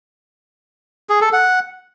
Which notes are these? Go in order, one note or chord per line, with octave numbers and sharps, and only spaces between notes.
G#4
A4
F#5